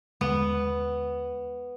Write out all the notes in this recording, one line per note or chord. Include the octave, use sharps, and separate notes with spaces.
D#2 D3 G#3 B3